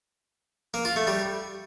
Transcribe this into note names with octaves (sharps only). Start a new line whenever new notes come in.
A#3
F4
A3
G3